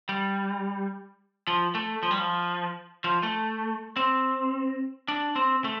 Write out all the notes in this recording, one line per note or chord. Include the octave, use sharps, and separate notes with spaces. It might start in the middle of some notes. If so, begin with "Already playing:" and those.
G3
F3
A3
F3
G3
F3
F3
A3
C4
D4
C4
A3